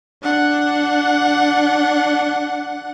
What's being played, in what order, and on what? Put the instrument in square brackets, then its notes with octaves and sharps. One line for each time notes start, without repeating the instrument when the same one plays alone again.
[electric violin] D4 F#5